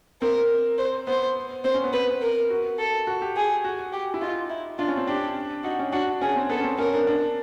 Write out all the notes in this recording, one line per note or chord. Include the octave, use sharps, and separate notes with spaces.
C4 A#4
C5
B3 C5
C4 C5
C#4
B3
C4 B4
A#4
F#4
A4
F#4
G4
G#4
F#4
G4
E4
D#4 F4
E4
D4 F4
C#4
C4
D4 G4
D#4 F#4
C#4
D4 F#4
C#4 G#4
C4
B3 A4
C#4
C4
C#4 A#4
D4
D4